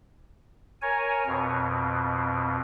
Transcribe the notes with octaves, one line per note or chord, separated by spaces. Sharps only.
A#4 C#5 G#5
F2 B2